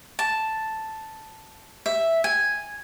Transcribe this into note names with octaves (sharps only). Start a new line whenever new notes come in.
A5
E5
G#5